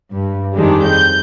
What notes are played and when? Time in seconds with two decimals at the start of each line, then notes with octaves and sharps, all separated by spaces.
0.14 G2
0.56 F2 D#3 G3 G#3 D4
0.87 G6